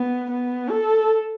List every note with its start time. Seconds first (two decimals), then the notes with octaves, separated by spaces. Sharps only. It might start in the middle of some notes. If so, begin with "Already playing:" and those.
Already playing: B3
0.31 B3
0.70 A4